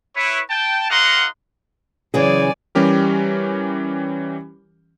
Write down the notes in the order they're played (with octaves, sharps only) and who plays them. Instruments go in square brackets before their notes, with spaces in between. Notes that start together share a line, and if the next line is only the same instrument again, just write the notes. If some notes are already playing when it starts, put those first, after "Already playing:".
[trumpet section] E4 B4 C#5
G5 A5
D#4 F#4 A#4 F5 F#5 C6
[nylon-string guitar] C#3 E3 G#4 [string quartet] F#3 D5 G#5
[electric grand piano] E3 G3 C#4 G4 A#4